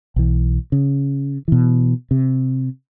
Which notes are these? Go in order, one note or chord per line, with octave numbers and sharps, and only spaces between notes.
B1 E3
C#3
B2 E3
C3